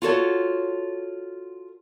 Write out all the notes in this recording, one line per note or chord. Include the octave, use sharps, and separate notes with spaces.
F4 F#4 A4 C#5